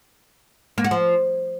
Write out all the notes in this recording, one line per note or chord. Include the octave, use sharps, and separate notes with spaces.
A#3
F#4
F3